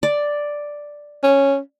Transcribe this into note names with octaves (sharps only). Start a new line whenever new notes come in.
D5
C#4